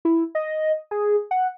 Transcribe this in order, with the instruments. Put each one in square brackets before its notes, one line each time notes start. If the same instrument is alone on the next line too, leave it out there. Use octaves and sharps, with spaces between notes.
[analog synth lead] E4
D#5
G#4
F#5